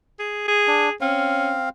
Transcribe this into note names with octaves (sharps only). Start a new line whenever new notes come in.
G#4
G#4
D4
C4 C#4 F5